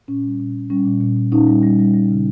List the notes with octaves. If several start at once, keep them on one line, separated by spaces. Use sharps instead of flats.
A#2 C#4
G3
A#2
A#2
G3 C#4
A#2
A#2
A#2
A#2 C#4 D#4
G3
G3
G3
G3
C#3